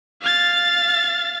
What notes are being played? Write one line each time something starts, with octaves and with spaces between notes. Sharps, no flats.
F5 A6